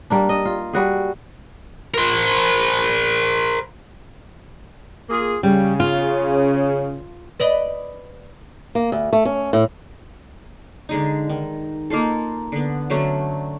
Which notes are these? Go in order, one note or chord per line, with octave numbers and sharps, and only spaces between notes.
G3 A#3 D4
D#5
F4
G3 F#4 G#4
A#4 C5
A#3 F4 G#4
C#3 G3
F4
B4 D5 D#5
A#3
D2
A3
C#4
A2
D3 G#3 D#4
D#3
A#3 D#4 F4 A4
D3 B3
D3 F#3 A3 C#4